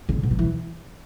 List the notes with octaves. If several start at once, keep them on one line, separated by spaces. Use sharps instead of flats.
C#3
B2
F#3
E3